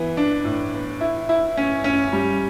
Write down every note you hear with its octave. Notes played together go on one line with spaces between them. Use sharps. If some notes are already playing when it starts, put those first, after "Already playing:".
Already playing: E3 B3
D4
A2
B3
E4
E4
C#4
C#4
G3